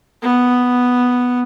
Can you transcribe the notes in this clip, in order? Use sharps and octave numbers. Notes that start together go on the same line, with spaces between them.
B3